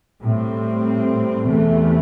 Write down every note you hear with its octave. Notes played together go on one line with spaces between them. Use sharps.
A2 G3 C4
E2 C3 E3 A3